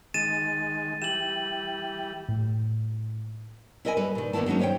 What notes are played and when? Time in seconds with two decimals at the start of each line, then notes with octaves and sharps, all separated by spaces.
0.14 D#3 G#3 A6 D#7 E7
1.02 E3 G3 G4 E7 F#7
2.29 A2
3.85 E4 A#4 D#5 E5 G#5
3.97 G3 A4 B4
4.15 A#2 D#3
4.33 D2 D#3 A#3 B3 E4 A5
4.46 D#3 F#3 G#3 C#4 D#4
4.59 G4 C5 C#5 F5 G5